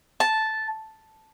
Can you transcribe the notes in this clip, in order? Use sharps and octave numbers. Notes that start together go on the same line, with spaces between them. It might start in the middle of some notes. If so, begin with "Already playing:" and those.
A5